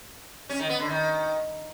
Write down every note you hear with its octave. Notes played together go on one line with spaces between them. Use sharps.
C#4
D#3
B3
D3
D#3